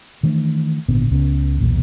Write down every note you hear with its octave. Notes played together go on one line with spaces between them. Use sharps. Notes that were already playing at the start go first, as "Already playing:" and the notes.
D#3 E3 A3 D4
G#1 A#2 D3 B3
C#2 C#3 B3 C#4
B1 E2 A#2